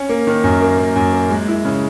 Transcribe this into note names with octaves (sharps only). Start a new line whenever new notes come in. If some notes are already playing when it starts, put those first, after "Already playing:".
Already playing: C#4
A#3
D#3
F#2
A#3
A#3
F#2
A#3
G#3
E4
C#3